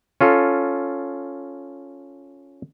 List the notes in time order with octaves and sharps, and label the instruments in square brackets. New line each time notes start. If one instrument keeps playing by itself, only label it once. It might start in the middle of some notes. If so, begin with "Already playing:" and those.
[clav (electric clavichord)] C#4 F4 A4